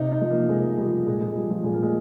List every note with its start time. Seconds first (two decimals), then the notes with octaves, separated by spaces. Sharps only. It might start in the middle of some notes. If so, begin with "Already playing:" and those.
Already playing: C3 D#4
0.12 D#4
0.21 F3
0.30 A#3
0.49 C3 G#3
0.78 F3 G3
1.07 A#2 G#3
1.21 G#3
1.35 F3 G3
1.50 F3
1.64 A#2 G#3
1.74 A#3
1.82 G#3